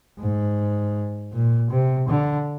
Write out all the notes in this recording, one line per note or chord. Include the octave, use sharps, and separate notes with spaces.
G#2
A#2
C3
D3